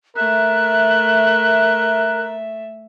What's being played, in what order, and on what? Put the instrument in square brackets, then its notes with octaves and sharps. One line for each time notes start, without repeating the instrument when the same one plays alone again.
[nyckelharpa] A3 E5 [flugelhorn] A#4 [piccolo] F#6